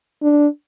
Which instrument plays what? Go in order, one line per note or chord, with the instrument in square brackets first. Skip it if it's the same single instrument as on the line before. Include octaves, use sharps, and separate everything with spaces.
[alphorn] D4